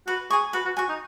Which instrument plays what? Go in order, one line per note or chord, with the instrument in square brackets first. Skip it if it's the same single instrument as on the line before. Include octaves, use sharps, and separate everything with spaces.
[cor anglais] F#4 [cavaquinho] B4
[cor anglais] G#4 [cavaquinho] G#5 C#6
[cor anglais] F#4 [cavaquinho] B4
[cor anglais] F#4
[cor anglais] F#4 [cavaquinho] G#5 C#6
[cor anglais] D#4